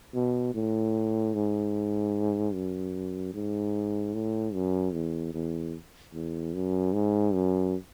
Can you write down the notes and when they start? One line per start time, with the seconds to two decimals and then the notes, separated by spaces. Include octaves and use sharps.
0.14 B2
0.54 A2
1.34 G#2
2.54 F#2
3.33 G#2
4.14 A2
4.54 F#2
4.93 E2
5.34 E2
6.14 E2
6.54 F#2
6.93 G#2
7.33 F#2